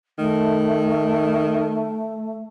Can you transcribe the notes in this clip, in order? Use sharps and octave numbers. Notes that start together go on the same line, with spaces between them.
D#3 A3